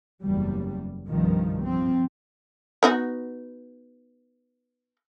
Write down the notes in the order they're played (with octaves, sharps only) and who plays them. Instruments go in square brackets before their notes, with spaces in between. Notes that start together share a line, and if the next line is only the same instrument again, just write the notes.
[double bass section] F#1 E2 G3
C2 G2 D#3 F3
F3 C4
[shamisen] B3 D#4 F#4